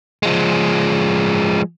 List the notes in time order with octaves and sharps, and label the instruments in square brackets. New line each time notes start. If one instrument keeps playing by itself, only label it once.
[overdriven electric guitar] F3 G#3